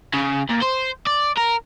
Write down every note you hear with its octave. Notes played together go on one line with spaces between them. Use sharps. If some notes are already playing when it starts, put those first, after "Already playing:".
C#3
A#2
C5
D5
A#4